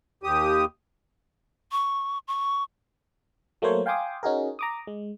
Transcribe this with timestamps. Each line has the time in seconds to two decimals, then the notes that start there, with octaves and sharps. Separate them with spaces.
0.23 D#2 G4 D#6
1.72 C#6
2.28 C#6
3.62 F#3 A3 A#3 A#4 C5 C#5
3.86 F5 G5 G#5 C6 D6 D#6
4.23 C#4 D#4 F#4 G#4 A#4
4.59 A#5 D6 D#6
4.87 G#3